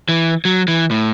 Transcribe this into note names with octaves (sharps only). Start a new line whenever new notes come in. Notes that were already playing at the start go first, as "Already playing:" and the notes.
E3
F#3
E3
A2